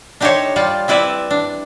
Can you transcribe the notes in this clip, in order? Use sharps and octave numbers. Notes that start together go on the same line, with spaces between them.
D4 D#4 G4 A4 C5 C#5
G3 F4 G4 D5
C4 E4 B4 D5 E5
D4